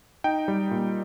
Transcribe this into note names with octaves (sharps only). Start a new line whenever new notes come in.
D#4 G5
G3
A#2